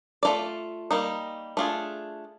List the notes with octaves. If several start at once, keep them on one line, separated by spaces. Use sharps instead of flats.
A3 C#4 F4 A4 D5
G3 A#3 D#4
A3 D4 F4 G#4